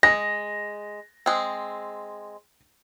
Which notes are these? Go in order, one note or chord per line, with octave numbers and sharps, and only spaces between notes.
G#3 A#6
G#3 C4